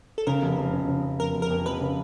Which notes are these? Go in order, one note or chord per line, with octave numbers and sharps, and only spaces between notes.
A4
C#3 A#4
F1
F1
C#3
C#3
F1
F2 A#4
F1
A#4
F2
F1 B4
C#3